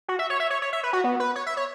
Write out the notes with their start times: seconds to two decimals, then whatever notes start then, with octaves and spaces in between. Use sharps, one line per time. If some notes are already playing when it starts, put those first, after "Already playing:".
0.08 F#4
0.19 E5
0.30 C#5
0.40 E5
0.50 C#5
0.62 C#5
0.73 E5
0.83 B4
0.93 F#4
1.04 B3
1.20 B4
1.36 C#5
1.46 E5
1.57 C#5